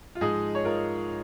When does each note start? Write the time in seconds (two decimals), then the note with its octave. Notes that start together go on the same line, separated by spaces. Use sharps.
0.15 F4
0.21 G#2 F3 G#3 D#4 G#4
0.55 C#5
0.65 F4 A#4